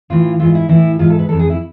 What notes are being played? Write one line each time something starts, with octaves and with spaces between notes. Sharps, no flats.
A2 E3 F4
G#2 E3 F4
E4
A2 E3 E4
G#2 E3 F4
A4
B4
F2 E3 A4
G#4
E4